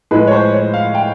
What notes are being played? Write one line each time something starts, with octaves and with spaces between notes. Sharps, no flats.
A2 F3 G#3 B4
C#5
C5
C#5
F5
G5